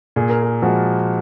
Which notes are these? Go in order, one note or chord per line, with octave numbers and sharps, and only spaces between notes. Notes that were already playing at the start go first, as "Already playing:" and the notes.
A#2 G#4
A#4
G#4
F3 G#3 F#4